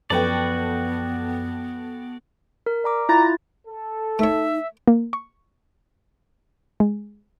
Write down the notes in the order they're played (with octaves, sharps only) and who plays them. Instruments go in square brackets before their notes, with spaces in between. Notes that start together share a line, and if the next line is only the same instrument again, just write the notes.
[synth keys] F#2 F3 [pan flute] B3 [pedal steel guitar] F#4 D5 [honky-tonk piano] A4 B4 G5
[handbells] A#4
D5 A#5 D6
[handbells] E4 F4 A6 [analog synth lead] A#5
[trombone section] A4
[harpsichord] A3 C#5 [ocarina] D#4 [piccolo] E5
[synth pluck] A#3
C#6
G#3